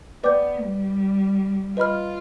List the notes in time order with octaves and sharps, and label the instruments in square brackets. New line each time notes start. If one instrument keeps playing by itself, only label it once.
[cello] B3 [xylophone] B4 D5 G5 D6 G6
[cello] G3
[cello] F4 [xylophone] B4 D#5 B5 F6